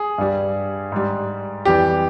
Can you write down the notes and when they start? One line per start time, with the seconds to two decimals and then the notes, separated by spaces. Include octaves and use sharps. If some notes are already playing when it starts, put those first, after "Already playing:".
Already playing: G#4
0.18 G2 G3
0.92 G#2 G3
1.65 F2 E3 G3 G4